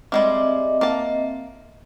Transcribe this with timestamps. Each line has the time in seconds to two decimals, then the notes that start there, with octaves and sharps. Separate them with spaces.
0.12 G3 G#3 A#3 C4 D#5 E5
0.81 A#3 A5